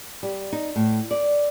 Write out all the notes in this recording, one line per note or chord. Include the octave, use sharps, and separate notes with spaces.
G3
D#4
A2
D5